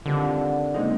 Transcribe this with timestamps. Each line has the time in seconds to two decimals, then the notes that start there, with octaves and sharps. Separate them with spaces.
0.05 D3 D#3 G3 C4 F4
0.74 A#2 G#3 C4 D#4